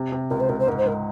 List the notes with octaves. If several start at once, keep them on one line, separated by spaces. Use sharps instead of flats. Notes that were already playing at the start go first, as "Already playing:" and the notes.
Already playing: C3
C3
C#2 A#4
C5
C#2 A#4
C5
G#2 A#4
C5
G#2 A#4